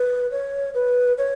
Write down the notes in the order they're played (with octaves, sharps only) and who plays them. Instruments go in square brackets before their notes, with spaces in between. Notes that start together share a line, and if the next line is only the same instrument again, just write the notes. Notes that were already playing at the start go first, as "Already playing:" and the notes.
Already playing: [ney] B4
C#5
B4
C#5